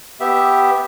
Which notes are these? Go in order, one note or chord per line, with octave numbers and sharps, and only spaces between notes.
B3 G4 E5